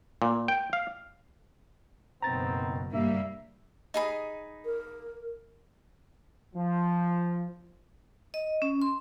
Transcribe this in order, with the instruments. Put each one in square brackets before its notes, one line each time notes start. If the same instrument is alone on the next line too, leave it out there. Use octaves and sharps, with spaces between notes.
[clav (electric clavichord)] A#2
G5
F5
[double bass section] F#1 B2 [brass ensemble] D#3 B3 C4 [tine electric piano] A#5 A6
[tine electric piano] G2 [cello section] G3 A#3 [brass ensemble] E5
[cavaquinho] D#4 G#4 B5
[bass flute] A#4
[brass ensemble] F3
[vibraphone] D#5
C#4
C6